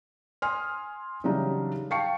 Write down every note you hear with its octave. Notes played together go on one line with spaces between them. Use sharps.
G#5 C6 D#6 F6
C#3 E3 F#3 G3 D4 D#4
F5 G5 A5 C#6 C7 C#7